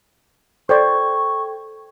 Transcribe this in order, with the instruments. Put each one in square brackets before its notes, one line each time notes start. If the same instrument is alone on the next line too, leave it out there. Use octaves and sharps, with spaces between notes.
[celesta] A4 G5 G#6 [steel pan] C5 D5 [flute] C#6